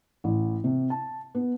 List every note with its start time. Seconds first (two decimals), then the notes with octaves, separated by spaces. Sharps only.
0.24 A1
0.64 C3
0.90 A5
1.35 B3